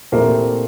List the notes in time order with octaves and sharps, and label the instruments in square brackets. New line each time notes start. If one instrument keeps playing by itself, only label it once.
[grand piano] A#2 A3 C4 E4 G4 [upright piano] A#3